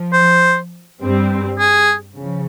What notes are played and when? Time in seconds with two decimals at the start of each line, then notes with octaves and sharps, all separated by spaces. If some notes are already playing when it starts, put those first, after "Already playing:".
Already playing: F3
0.13 C5
0.99 G2 G3 C4
1.58 G#4
2.16 C#3 F3